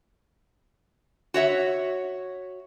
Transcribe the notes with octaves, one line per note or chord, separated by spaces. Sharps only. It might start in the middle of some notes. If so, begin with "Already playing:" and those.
F#4 C#5 E5